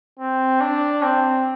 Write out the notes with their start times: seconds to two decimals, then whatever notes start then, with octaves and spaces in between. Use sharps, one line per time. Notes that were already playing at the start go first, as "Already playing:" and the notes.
0.19 C4
0.60 D4
1.02 C4